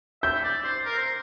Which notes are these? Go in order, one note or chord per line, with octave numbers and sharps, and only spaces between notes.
E5 G6
D5
C5
A#4
C5